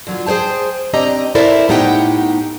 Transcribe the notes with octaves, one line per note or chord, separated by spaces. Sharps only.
D3 F#3 F4
G#4 C5 C#5 G5 A5
C4 D4 G4 D#5 A#5
E4 A4 A#4 C5 D5 E5
A2 B3 D#4 G4 F#5 G5